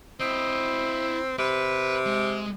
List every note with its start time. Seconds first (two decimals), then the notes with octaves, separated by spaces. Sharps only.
0.20 C4 E4 D#5
1.39 C3 B4
2.06 G#3